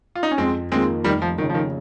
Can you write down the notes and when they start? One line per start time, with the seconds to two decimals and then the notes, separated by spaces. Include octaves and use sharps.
0.15 F4
0.23 D#4
0.31 C#4
0.38 F2 G#3 C4
0.72 D#3 G#3 A#3 C4 F4
1.04 F1 D#3 G3
1.22 F3
1.38 F2 D#3
1.41 C#3
1.49 F3
1.54 D#3